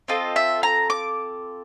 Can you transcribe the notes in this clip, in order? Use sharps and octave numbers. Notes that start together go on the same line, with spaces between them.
C4 F4 A4 D#5
E5
A#5
D6